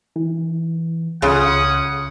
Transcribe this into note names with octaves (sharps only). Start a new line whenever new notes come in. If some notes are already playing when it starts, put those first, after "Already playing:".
E3
C#2 C#3 C#4 F4 F#5 D#6